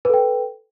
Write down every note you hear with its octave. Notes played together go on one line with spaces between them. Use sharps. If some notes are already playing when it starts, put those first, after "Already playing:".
A4 B4 G5